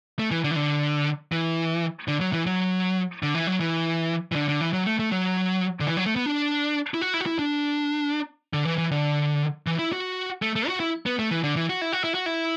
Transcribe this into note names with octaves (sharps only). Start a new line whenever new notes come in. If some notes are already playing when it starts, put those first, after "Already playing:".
A3
E3
D3
E3
D3
E3
D3
F#3
E3
F#3
D3
E3
F#3
E3
E3
D3
D3
E3
F#3
A3
A3
F#3
D3
E3
F#3
A3
B3
D4
E4
F#4
E4
F#4
E4
D4
D3
E3
E3
D3
E3
E4
F#4
A3
A3
F#4
E4
B3
A3
E3
D3
E3
F#4
E4
F#4
E4
F#4
E4